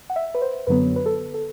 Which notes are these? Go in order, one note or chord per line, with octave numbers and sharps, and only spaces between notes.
F#5
E5
B4
C5
F#2 D3 F#3 B3 B4
B4
A4
A4